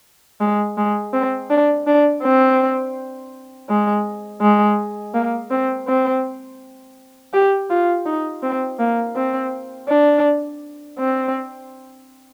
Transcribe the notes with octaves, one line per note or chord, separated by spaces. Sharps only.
G#3
G#3
C4
D4
D4
C4
G#3
G#3
A#3
C4
C4
G4
F4
D#4
C4
A#3
C4
D4
C4